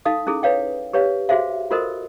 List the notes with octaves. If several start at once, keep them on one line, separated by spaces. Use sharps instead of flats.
D#4 A4 F5 D#6
C#4 E4 G#4 A4
B4 C#5 F5 G5
G4 B4 C#5 F5
F#4 G#4 C5 E5 F5
F4 F#4 A4 A#4 C5 D#5